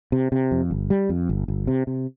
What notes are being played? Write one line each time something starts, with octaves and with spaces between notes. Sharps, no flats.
C3
C3
F2
G1
G3
F2
G1
G1
C3
C3